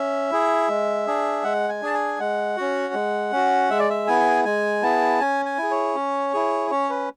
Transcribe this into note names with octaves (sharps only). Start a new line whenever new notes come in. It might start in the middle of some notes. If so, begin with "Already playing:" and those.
Already playing: C#4 E5
E4 G#4
G#3
D4 G#4
G#3 F#5
G#5
D4 G#4 A5
G#5
G#3 F#5
C#4 F#4
G#3
C#4 F#4
G#3 E5
D5
E5
B3 E4 G#4 G#5
G#3 G#5
B3 E4 G#4 A5
C#4 G#5
G#5
E4 G#4
C#5
C#4
E4 G#4
C#4 C#5
B4